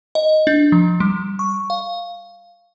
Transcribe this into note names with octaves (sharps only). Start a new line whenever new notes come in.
D#5
D4
F3
G3
C#6
F5